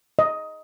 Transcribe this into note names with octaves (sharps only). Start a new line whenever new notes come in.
D#5